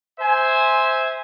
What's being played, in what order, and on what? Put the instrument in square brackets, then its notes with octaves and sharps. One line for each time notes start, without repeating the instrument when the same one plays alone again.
[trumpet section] C5 E5 G#5